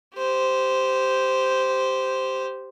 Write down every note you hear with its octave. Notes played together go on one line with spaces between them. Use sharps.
G4 C5